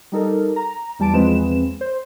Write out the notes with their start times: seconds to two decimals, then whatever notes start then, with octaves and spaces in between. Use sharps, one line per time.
0.12 G3 D#4 A4 A#4
0.56 A#5
0.99 E2 G3 A5 D7
1.14 E2 F3 G#3 C4 B4 E7
1.81 C5